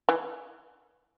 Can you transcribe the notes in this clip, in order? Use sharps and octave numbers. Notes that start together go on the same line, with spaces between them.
E3